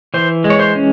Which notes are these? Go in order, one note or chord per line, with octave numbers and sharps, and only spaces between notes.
E3 C5
G#3
C#5
C5
C#4